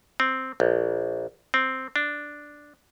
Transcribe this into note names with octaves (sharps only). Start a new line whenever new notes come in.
C4
A#1
C4
D4